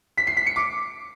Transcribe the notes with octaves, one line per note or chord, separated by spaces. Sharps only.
B6
C7
B6
C#7
D6